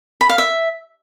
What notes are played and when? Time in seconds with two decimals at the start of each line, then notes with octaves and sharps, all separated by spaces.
0.21 B5
0.29 F5
0.38 E5